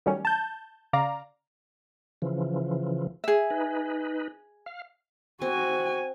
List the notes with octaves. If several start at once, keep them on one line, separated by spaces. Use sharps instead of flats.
D#3 F#3 G3 A3 C#4
A5 G6
C#3 D5 F5 A#5
C#3 E3 F3
G#4 E5
D#4 B4
F5
C4 F#4 G#5